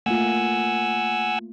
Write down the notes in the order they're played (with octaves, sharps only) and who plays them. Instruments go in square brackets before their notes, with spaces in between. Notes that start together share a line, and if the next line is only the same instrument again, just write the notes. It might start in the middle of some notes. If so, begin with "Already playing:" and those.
[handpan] A3 A#3 F4 [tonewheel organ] F#5 G#5 E6